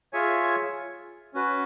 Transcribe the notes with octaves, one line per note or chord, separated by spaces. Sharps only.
F4 G#4 C#5 E5 G#5
C#4 F#4 B4